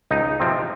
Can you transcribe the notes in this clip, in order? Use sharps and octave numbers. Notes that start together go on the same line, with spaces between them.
C#2 D#4
C3 F3 C4